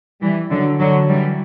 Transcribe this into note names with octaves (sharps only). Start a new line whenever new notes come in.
E3 G3
D3 F#3
D3 F#3
E3 G3